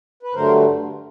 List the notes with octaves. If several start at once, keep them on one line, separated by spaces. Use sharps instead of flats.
B4
G2 D3 F#3 A3 A#4 C5